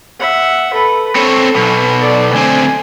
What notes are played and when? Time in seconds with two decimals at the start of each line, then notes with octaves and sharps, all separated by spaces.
0.20 E5 F#5
0.73 A4 B4
1.15 C4 A4 C#5
1.55 B1 B2
2.00 A4 D5
2.32 D2 C4 G#5